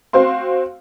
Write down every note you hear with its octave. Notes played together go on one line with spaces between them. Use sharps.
C4 F#4 C5 F5 C6